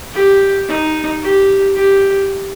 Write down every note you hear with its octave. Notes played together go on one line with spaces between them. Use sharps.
G4
D#4
G4
G4